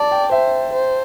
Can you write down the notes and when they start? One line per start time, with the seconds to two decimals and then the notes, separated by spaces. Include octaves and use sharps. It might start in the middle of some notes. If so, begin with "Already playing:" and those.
Already playing: D5 A5
0.11 G5
0.31 C5 E5
0.73 C5